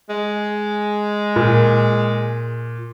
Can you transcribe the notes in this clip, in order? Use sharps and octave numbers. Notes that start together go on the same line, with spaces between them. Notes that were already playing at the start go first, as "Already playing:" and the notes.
G#3
A#2